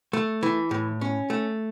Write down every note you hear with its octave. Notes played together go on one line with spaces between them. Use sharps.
A3
E3
A2
C#4
A3